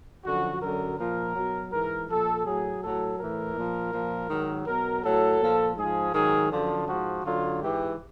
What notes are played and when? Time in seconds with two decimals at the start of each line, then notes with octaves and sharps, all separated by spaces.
0.25 F#2 D3 F3 F#4
0.61 F#2 D3 F#3 A#4
0.98 A#2 F3 A#4
1.35 B2 F#3
1.72 G#2 E3 A#4
2.09 A#2 F3 A4
2.45 A2 F#3 G#4
2.82 A2 F#3 A4
3.19 A2 E3 A#4
3.56 A#2 F3
3.93 A#2 F3
4.30 G#2 D#3 F#3
4.66 B2 F#3 A#4
5.03 A2 F#3 A4
5.41 A#2 F3
5.77 G#2 F3 G#4
6.13 G#2 D#3 F#3 G#4
6.51 F#2 D3 F3
6.87 G#2 F3 F#4
7.24 F#2 D3 F#3 F4
7.61 G#2 E3 G4